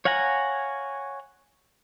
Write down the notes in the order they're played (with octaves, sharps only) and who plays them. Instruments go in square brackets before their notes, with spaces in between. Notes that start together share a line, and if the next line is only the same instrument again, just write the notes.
[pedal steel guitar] C#5 F5 F#5 G#5 A#5